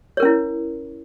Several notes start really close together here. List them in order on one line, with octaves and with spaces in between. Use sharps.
C#5 A#4 C#4 E4